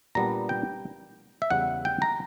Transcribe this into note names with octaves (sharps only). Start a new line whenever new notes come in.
A#2 G3 B3 D4 A#5
G5
E5
E2 C#3 G3 F#5
G5
A#5